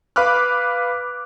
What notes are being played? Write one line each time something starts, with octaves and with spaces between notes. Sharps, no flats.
B4 F5 B5 D6 F6 F#6